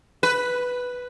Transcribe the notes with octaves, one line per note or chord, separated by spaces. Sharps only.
B4